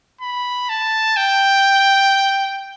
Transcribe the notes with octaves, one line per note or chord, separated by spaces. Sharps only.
B5
A5
G5